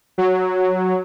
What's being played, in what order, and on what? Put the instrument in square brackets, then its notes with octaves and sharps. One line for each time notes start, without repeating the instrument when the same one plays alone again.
[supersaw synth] F#3